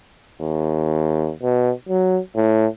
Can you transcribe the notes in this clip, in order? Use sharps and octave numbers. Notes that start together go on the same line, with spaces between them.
D#2
B2
F#3
A2